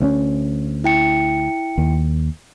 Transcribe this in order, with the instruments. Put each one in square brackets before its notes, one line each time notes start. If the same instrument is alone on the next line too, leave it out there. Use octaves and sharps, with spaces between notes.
[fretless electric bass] D2 C4 C#4
[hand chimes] E4 G5 C#7
[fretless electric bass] D#2